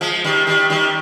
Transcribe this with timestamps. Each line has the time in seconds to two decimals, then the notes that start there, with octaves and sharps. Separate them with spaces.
0.01 F3 G#3
0.24 D#3 G3
0.47 D#3 G3
0.70 D#3 G3